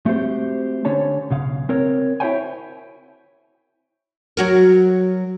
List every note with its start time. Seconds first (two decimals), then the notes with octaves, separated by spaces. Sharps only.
0.06 A3 C4 F#4 G4 C5
0.85 D3 C#4 C#5 A5
1.30 B1 C#3 F5
1.69 C4 A#4 C#5
2.20 E4 F#4 C5 C#5 G5 G#5
4.37 F#3 F#4 A#4